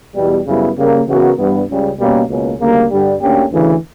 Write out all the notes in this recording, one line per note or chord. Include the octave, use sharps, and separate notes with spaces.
E2 B2 G3
F#2 C#3 G3 B3 E4
C#3 G3 A#3
C#3 E3 B3 F#4 A#4
G2 E3 G3 B3
C#2 C#3 G3
B2 G3 A#3 C#4
C#2 B2 A#3 C#4
D2 C#3 G3 A#3
G2 D3 G3
D2 D3 A#3 C#4 G4
D2 C#3 E3